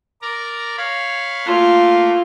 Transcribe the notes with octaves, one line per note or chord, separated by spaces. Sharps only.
A#4 D5 A#5
C#5 F5 B5
A3 A#3 F4